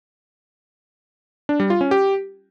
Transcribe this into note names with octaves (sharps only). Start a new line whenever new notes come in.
D4
G3
F4
C#4
G4